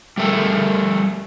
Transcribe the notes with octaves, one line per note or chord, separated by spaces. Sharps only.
G3 A3 A4 A#4